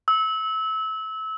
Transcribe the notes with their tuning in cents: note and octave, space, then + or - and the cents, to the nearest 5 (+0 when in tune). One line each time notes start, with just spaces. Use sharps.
E6 -25